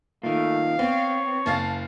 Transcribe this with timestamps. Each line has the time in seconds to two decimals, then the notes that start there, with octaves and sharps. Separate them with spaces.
0.23 A#2 D#3 A3 F5
0.79 B3 C4 C#5
1.46 F#1 F5 A5 A6